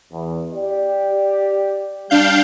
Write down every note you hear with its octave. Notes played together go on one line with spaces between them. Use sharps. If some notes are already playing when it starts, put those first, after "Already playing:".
E2
G4 D5
G3 D4 F5 G6